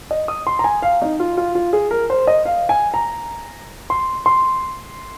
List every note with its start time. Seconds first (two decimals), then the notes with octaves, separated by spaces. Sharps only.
0.11 D#5
0.28 D#6
0.47 C6
0.59 A#5
0.64 G#5
0.82 F5
1.02 D#4
1.20 F4
1.37 F4
1.55 F4
1.73 G#4
1.91 A#4
2.10 C5
2.27 D#5
2.45 F5
2.69 G#5
2.94 A#5
3.90 C6
4.26 C6